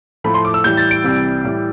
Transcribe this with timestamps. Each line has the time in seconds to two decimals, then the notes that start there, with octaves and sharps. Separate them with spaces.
0.24 A2 F3 A3 B5
0.34 C6
0.45 D6
0.54 E6
0.64 A2 E3 G3 G6
0.77 A6
0.91 D7
1.04 C2 C3 E3 G3
1.44 A2 E3 G3